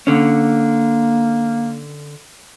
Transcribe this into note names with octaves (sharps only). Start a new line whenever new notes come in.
D3 A#3 C#4